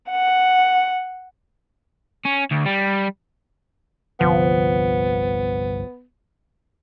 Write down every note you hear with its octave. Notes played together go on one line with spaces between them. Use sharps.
F#5
C#4
D2
G3
G1 C2 D3 F3 B3